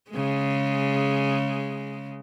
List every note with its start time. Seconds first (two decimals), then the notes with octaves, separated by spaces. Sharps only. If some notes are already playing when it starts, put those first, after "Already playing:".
0.10 C#3 G#3